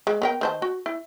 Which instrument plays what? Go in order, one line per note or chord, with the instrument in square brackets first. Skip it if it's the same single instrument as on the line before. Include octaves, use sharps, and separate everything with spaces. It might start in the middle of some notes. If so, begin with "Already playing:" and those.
[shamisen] G#3
B3 A#4 G5
D#3 C5 A5
F#4
E4